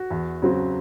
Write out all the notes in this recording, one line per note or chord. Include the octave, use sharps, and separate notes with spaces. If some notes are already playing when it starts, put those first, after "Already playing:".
Already playing: F#4
E2
C#3 F#3 C4